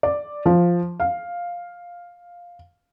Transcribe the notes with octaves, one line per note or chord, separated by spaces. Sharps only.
D5
F3
F5